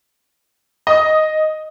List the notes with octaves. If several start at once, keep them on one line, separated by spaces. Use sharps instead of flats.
D#5 D#6